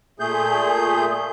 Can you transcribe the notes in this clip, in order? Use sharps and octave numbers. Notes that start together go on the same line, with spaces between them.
A#2 A3 G#4 G6